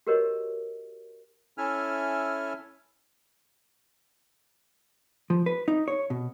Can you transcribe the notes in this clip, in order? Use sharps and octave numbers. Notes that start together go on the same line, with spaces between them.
F#4 G4 A#4 B4 C#5 D#5
C#4 E4 A4 E5 G#5 F6
F3
B4
D#4
C#5
B2